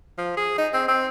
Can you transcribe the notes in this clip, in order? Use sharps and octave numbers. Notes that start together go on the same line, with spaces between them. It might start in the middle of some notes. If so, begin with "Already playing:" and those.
F3
G#4
D#4
C4
C4